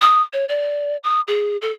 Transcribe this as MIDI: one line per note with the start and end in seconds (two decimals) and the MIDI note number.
0.01 0.22 87
0.33 0.45 73
0.49 0.97 74
1.04 1.21 87
1.28 1.57 68
1.62 1.72 69